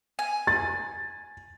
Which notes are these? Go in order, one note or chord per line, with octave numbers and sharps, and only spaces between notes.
G#5
A6